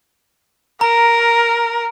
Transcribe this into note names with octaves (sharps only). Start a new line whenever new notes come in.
A#4 A#5